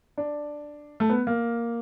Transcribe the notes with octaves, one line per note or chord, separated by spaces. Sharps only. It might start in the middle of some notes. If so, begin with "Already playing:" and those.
D4
A3
B3
A#3